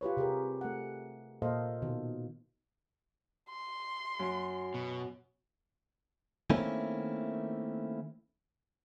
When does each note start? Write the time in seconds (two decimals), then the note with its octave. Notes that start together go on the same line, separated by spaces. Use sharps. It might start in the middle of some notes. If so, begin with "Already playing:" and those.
0.01 F4 G4 B4 C#5
0.17 C3 G4 G#4 A#4
0.61 A3 F#5
1.42 A#2 A#3 A4 C5 D#5 F5
1.82 B2 D#3
3.49 C6
4.19 F#2
4.74 B2
6.50 D#3 A3 A#3 C4 C#4 E4